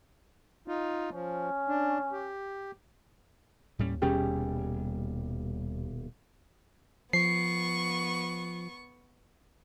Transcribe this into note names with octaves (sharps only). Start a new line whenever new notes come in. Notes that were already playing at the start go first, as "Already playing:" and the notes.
D#4 F4
F3 C#4
D4
G4
D#2 A2 G3 C#4
D#1 B2 G3 C#4 G4 G#4
F3 B3 C#6 C7